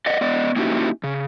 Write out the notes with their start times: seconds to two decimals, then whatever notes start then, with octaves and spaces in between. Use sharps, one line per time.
0.06 D5 D#5 F#5
0.21 B3 D5 D#5
0.56 A#3 C#4 D#4 E4 F#4 G4
1.04 C#3